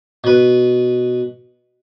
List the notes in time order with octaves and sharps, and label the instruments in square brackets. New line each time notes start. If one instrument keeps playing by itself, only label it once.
[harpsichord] B2 B4